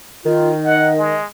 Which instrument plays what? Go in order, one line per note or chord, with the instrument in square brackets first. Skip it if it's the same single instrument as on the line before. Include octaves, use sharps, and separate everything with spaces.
[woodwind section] D#3 [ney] F4
[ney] D#5 [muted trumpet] F#5
[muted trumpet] G#3